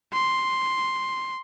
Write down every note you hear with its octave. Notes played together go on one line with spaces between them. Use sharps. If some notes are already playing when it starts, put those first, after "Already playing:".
C6